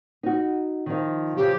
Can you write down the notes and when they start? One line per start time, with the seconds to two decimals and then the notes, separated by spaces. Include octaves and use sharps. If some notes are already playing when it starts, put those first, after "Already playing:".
0.23 D#4 F#4
0.86 D#3 F3
1.37 C#3 F3 G4